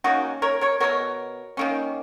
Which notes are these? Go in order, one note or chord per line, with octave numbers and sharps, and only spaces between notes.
D#3 A#3 C#4 D#4 F#4
A#4 C#5
A#4 C#5
B2 G#3 B3 A#4 C#5
D#3 A#3 C#4